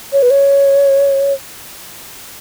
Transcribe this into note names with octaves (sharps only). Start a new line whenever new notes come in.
C#5
B4
C#5